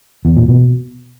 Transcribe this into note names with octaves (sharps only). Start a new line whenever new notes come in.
E2
A#2
B2